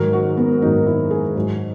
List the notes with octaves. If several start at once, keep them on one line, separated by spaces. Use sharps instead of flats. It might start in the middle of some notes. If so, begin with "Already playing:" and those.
Already playing: G#2 D#3 F#3 A#4
F#4
B3
G#2 D#3 F#3 D#4
E4
G#4
G#2 F#3